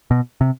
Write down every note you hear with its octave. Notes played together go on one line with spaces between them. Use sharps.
B2
C3